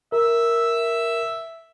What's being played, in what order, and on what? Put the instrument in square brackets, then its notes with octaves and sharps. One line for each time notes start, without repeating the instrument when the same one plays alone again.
[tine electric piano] A#4 [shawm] E5